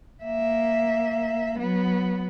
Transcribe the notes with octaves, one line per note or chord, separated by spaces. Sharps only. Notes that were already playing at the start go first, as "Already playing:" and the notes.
A#3 E5
F#3 B3